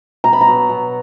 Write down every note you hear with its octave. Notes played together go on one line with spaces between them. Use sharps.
B2 A#5
B5
A#5
F#3 B3
B2